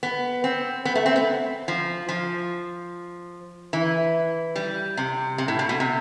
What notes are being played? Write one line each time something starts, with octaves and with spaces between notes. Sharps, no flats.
B3
C4
B3
A3
C4
B3
F3
F3
E3
G3
C3
C3
A2
B2
B2
C3